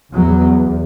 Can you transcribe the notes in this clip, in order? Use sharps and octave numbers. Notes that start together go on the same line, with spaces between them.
E2 F#3